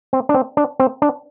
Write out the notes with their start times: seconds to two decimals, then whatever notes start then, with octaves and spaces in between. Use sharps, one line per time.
0.13 C4
0.29 D4
0.34 C4
0.57 D4
0.80 C4
1.02 D4